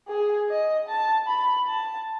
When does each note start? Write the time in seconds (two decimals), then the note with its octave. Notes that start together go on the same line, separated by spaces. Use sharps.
0.08 G#4
0.48 D#5
0.88 A5
1.27 B5
1.67 A5